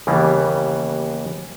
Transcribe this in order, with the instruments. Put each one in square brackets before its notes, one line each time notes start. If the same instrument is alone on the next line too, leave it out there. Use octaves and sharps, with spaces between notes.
[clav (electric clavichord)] D#2 C#3 E3 G3 A#3 B3